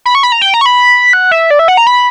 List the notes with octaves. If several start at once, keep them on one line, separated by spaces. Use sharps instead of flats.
B5
C#6
B5
A#5
G5
A#5
C#6
B5
F#5
E5
D5
E5
F#5
A#5
B5